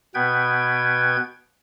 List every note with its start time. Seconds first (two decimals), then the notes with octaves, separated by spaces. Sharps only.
0.15 B2 B3 B4 G5 G#6